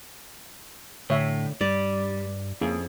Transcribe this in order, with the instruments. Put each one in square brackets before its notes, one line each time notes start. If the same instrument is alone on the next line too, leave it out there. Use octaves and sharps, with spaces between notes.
[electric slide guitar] A2 [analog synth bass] D3 [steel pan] C#5 E5
[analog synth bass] G2 [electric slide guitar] G3 [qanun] D5
[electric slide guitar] F2 [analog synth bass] A#3 [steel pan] C#4 E4 G#4